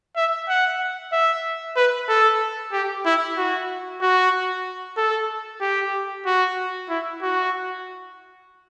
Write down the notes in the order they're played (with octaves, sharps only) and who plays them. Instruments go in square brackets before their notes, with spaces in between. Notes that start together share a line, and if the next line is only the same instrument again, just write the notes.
[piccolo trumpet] E5
F#5
E5
B4
A4
G4
E4
F#4
F#4
A4
G4
F#4
E4
F#4